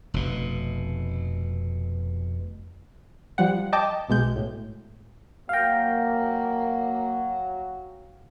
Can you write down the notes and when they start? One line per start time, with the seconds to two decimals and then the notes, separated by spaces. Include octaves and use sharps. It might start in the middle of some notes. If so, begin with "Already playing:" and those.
0.14 F1 B2
3.38 F3 G3 F#5
3.73 D#5 G5 A5 D6
4.08 B1 B2 G#3 G6
4.36 A2
5.49 F#3 A#3 F5 G5 F6 A#6